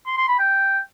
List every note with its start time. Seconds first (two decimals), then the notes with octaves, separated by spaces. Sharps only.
0.07 C6
0.17 C6
0.28 B5
0.39 G5